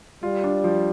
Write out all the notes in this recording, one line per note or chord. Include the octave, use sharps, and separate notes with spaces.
G3 F4
D4
F3